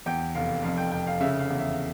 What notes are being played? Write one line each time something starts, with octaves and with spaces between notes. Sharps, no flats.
E2 G5
F1 F5
F2 F5
G5
F1 G5
F5
C#3 E5
F5
E2
E5